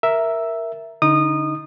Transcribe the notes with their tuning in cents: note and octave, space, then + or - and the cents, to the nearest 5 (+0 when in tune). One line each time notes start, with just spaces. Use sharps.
A#4 +0 E5 +0
D3 -20 D#4 +10 D#6 -20